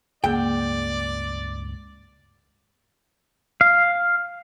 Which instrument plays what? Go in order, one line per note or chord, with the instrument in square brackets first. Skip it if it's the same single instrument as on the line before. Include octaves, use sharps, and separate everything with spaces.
[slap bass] C#2 G2 [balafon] A#3 G#4 [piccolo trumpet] D5 [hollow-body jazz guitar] G5
[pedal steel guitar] F5